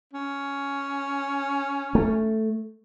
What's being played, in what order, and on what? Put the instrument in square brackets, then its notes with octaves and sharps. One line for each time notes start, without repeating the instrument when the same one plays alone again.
[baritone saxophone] C#4
[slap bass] A3